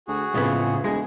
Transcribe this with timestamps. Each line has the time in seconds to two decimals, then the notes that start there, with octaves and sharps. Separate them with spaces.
0.08 D2 F#4 G#4
0.35 F2 A2 C#3 B3
0.84 E1 G#3 G#4